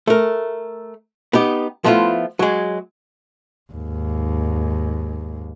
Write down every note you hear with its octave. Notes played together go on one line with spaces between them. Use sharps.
A3 A#4
B3 D#4 G4
F3 A3 B3 E4 F4
F#3 G#3
D#2 G#2